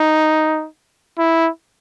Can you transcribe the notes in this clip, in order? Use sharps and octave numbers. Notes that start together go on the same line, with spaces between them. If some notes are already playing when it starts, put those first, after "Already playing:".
Already playing: D#4
E4